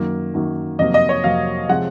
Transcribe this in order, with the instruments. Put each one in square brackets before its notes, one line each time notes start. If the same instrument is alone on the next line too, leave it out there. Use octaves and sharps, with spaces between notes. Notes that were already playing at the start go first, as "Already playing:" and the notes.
Already playing: [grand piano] F#2 D#3 F#3 A#3
F#2 D#3 F#3 A#3
F2 C3 F#3 A#3 D#5
D#5
C#5
F2 C3 F#3 A#3 F5
C3 F3 G#3 F#5